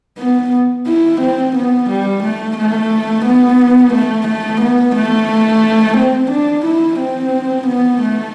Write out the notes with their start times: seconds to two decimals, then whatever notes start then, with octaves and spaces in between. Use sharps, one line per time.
0.19 B3
0.87 E4
1.21 C4
1.56 B3
1.90 G3
2.24 A3
2.57 A3
3.25 B3
3.93 A3
4.27 A3
4.61 B3
4.95 A3
5.97 C4
6.31 D4
6.65 E4
6.99 C4
7.67 B3
8.01 A3